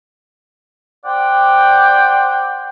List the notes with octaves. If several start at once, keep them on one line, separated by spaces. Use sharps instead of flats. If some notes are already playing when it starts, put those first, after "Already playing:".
C5 D5 F#5 G5